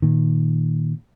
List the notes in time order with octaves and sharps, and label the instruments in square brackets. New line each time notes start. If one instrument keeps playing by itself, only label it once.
[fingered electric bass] A#2 D#3